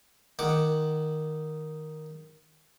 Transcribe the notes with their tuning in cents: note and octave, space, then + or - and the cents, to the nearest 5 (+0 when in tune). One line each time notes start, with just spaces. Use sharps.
D#3 +0 F#5 +0 D6 +5